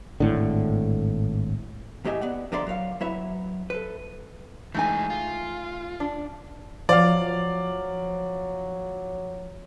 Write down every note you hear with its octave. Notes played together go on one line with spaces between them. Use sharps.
G#1 A2 D3
E2 A2 G4 D#5 E5 G#5
B3 D5 F#5
D3 F3 A#4 D5 E5 C6
F#3 A#4 C#5 F5
F#3 E4 B4 C#5 E5
A4 B4
E3 G#3 A3 D#4 G#5
F4
D4
F3 F#3 D5 F5